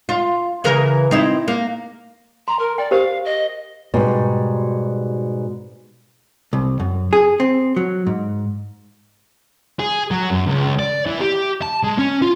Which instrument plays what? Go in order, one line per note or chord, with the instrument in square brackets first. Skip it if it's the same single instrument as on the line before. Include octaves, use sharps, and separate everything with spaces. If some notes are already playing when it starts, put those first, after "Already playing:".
[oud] F4
C#3 E3 A#4
C4 D#4 E4
A#3
[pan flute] A#5 [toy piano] C6
[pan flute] A#4
[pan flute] D5 [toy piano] G5
[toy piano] G4 A#4 C5 [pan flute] F5
[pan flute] D#5
[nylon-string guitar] G#2 B2 G3
[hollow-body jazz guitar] C2
F#2
G#4
C4
F#3
G#2
[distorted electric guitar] G#4
F#3
F#2
C#2
D5
E3
G4
A5
G#3
C#4
F4